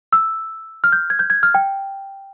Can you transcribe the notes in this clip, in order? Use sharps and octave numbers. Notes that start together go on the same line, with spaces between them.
E6
F6
G6
G#6
G6
G#6
F6
G5